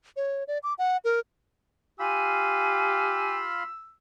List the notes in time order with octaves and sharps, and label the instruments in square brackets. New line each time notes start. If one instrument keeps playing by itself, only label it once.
[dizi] C#5
D5
D6
F#5
A#4
[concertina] F4 F5 B5 [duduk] G4 [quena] G#5 [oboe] E6